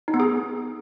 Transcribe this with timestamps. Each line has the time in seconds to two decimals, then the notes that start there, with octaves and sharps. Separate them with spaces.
0.08 D#4
0.14 B3
0.20 G#4